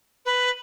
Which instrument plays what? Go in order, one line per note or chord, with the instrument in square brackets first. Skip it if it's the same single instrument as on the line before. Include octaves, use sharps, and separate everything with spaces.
[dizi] B4